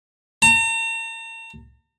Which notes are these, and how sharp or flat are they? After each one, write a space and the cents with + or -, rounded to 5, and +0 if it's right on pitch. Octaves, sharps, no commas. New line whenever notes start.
A#5 -45